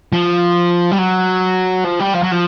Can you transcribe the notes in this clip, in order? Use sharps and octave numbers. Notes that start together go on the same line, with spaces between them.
F3
G3
F#3
F3
G3
F3
F#3
F3